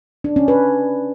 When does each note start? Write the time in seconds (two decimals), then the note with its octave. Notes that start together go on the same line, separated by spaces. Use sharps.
0.24 D4
0.36 C#4
0.48 B4